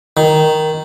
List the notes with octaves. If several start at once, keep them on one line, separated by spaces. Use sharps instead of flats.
D#3